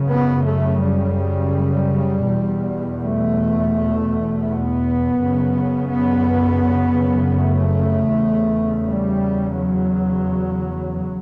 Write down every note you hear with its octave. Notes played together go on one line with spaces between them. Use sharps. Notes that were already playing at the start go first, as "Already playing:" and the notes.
Already playing: F#2 C#3
B3
A3
G3
E2 B2
A3
B3
F#2 C#3
B3
A3
E2 C#3
G3
F#3